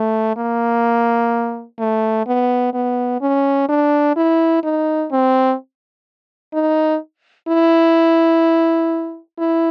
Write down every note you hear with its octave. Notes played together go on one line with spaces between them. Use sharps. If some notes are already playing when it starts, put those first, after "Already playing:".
Already playing: A3
A#3
A3
B3
B3
C#4
D4
E4
D#4
C4
D#4
E4
E4